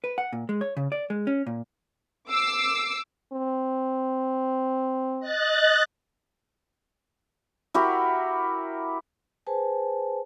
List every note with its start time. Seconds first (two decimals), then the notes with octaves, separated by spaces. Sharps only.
0.04 B4
0.18 F#5
0.33 A#2
0.49 G#3
0.61 C#5
0.77 C#3
0.92 D5
1.10 G#3
1.27 C#4
1.47 A#2
2.30 D6 E6 C7
3.33 C4
5.20 D#5 F#6 A6
7.74 E4 F#4 G4 A#4
9.47 G#4 B4 C5 G#5 A5